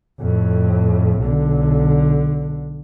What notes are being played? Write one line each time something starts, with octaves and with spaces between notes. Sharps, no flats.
F2 A2
B1 D3